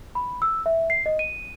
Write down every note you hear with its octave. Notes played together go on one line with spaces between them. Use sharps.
B5
E6
E5
C7
D#5
D#7